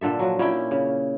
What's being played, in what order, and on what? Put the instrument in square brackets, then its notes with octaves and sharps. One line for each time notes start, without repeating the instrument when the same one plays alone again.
[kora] A#2 D3 A4 E5
F3 F#3
A#2 C#4 E4 G5
C#3